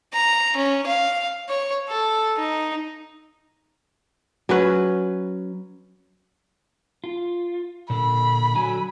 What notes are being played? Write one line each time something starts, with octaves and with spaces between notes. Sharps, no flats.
A#5
C#4
F5
C#5
A4
D#4
F#3 C#4 B4
F4
A#2 D3 B5
D3 F#3 G#5